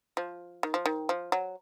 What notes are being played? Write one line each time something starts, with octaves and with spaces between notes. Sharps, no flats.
F3
D#3
F3
D#3
F3
F#3